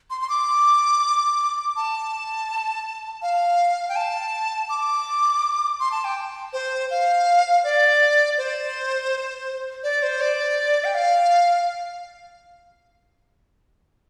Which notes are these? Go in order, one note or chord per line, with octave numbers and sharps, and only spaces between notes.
C6
C6
D6
A5
F5
G5
A5
D6
C6
A5
G5
C5
F5
D5
C5
D5
C5
D5
G5
F5